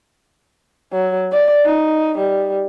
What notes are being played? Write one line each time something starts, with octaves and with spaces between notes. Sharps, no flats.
F#3
D5
D#4
G3